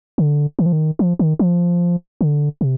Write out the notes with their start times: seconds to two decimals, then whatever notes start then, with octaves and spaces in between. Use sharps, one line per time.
0.18 D3
0.59 D#3
0.66 F3
0.73 D#3
0.99 F3
1.19 D#3
1.39 F3
2.21 D3
2.61 C3